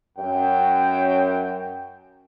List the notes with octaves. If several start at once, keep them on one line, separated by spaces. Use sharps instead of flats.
F#2 G5